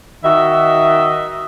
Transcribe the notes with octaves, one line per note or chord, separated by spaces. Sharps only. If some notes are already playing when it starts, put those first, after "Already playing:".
D#3 F#4 D#5 E5